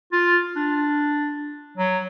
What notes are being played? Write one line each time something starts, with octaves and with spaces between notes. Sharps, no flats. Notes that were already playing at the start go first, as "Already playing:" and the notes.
F4
D4
F#3